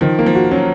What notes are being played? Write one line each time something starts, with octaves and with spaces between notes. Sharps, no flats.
D#3 F3
A#3
F3
F#4
F#3 C#4